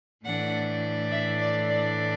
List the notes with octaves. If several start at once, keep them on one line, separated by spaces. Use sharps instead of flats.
A2 E3 A3 D4 F#5
E5
D5
D5